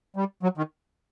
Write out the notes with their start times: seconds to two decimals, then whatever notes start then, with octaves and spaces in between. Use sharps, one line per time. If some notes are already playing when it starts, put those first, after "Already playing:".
0.16 G3
0.43 F#3
0.57 D#3